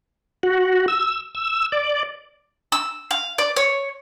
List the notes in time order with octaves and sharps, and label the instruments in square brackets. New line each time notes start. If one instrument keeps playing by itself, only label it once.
[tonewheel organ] F#4
E6
E6
D5
[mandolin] E6
F5
D5
C#5